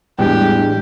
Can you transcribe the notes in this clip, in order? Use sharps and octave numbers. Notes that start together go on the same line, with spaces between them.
A1 E2 G3 G#3 D4 G4 F#6